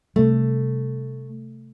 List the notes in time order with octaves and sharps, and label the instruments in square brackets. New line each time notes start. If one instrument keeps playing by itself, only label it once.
[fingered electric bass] C3 G3 [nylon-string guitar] A3